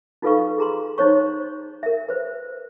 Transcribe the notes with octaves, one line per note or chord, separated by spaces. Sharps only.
D#4 F4 A4 B4 F5 C#6
G#4 A#5 C6
D#4 C5 C#5 C#6
A#4 E5
B4 C5